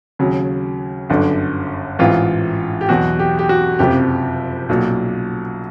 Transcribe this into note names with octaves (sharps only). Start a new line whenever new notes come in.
D#2 C#3 F#3
G1 F#2 D3
A1 G#2 E3 F4
G4
E2 B2 F#3 F#4
G4
G4
F#4
F#1 F2 C3 F3 G4
B1 A#2 F#3